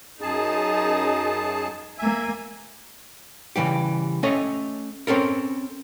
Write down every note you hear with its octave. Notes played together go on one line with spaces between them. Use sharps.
F#2 D#4 G#4 A5
A#3 E5 G#5
C#3 E3 G3 G4
A3 C#4 A4 C#5 D#5
C4 C#4 A4 A#4